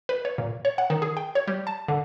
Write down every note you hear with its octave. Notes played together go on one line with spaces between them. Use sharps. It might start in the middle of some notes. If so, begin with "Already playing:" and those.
B4
C#5
A#2
C#5
F#5
D#3
G#4
G5
C#5
G3
A5
D3